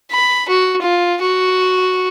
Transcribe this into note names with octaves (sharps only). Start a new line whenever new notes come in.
B5
F#4
F4
F#4